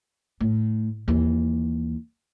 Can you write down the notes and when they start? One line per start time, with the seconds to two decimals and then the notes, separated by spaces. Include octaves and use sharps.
0.40 A2
1.08 D#2 E3